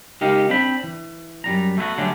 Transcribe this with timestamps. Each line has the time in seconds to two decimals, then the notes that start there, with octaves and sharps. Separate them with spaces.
0.21 C#2 D#4 G4 A#4 F5
0.50 C4 D4 G5 B5
0.83 E3
1.44 F#2 G3 A#5
1.78 A3 B3 E4 F#4
1.98 D3 F#3 G3 A3 C#4 D4